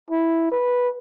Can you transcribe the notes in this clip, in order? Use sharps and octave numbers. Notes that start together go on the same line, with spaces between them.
E4
B4